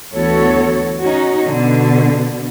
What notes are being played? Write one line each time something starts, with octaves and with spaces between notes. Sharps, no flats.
D2 E3 B3 F#4 A4 C#5
C#4 D#4 F#4
B2 D3